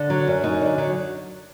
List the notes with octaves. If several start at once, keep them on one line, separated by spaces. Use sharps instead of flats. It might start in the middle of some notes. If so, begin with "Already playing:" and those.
Already playing: D3
F#3
F#2
F#2 D#4
D3
F#3